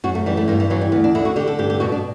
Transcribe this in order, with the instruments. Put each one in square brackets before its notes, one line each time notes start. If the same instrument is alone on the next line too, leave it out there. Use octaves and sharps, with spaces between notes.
[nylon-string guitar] F#2 F#4
A3
E3 G3
A3
G2 G3
E3
E3 F#3
G3
D2 B3
D4
D3 E4
F#4
D3 G4
A4
G2 G4
G4
B2 F#4
D4